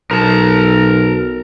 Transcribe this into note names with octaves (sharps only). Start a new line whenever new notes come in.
B1 A#4 A5